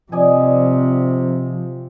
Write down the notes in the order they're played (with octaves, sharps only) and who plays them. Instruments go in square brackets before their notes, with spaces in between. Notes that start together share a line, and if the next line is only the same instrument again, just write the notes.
[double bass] C3 [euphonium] F3 [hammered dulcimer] D5 D#5 G#5